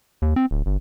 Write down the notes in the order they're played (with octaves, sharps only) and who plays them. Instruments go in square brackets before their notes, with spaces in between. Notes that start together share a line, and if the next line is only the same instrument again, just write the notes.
[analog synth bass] D#2
C4
D1
G1